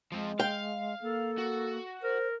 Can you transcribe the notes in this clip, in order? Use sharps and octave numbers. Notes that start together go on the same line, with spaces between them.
F3 G#3 C4
F5 G5
A#3 A4
F#4
A#4 C5